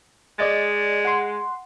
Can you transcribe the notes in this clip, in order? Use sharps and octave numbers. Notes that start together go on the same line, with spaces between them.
G#3 D5 D#5 A6
F#5 C6